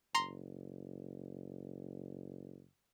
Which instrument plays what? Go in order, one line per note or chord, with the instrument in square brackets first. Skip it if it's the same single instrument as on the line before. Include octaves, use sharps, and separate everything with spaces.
[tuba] F#1 [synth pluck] A#5 C6